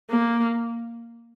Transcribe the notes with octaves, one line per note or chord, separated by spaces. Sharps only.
A#3